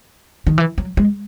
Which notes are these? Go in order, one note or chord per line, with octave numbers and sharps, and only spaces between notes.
D#3
E3
F#3
G#3